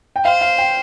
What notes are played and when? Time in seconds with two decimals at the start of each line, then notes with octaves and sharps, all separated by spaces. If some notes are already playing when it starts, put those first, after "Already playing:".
0.16 G5
0.25 C5 F5
0.41 F5
0.58 G5